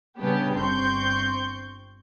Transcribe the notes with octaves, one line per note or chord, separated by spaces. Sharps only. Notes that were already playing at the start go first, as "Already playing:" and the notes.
C#3 G3 B3 C#4 D4 G4
G1 C4 C6 C#6 G6